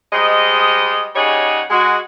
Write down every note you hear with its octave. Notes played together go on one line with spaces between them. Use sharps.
G3 G#3 C5 D#5
C#3 G3 D#4 G#4 C#5 F#5
G#3 F#4